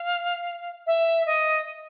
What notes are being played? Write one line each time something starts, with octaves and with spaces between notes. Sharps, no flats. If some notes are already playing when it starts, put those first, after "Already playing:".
Already playing: F5
E5
D#5